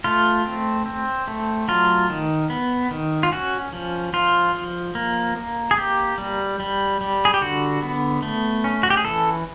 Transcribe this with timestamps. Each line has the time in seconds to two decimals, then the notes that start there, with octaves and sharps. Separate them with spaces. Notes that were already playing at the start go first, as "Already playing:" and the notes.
0.04 A3 F4
0.46 C4
0.86 C4
1.28 A3
1.68 F#3 F4
2.10 D#3
2.50 B3
2.91 D#3
3.23 F4
3.32 C#4 F#4
3.73 F3
4.13 F3 F4
4.55 F3
4.95 A#3
5.37 A#3
5.71 G#4
5.77 A#3 G4
6.18 G3
6.60 G3
7.01 G3
7.25 G#4
7.34 G4
7.41 D3 F#4
7.82 B3
8.22 A3
8.64 C#4
8.83 F#4
8.90 G4
8.97 G#4
9.05 E3 A4